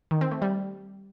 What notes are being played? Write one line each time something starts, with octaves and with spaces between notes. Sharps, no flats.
D#3
C4
A3
G3